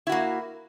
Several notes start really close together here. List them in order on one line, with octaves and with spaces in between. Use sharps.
E4 F#4 A#3